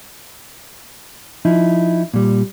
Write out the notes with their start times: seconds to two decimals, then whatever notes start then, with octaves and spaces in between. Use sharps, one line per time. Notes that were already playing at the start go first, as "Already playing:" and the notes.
1.45 F3 D#4 E4
2.14 A#2 G3